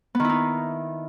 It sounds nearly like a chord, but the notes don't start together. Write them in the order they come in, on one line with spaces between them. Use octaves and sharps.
B3 D#3 E4 D#4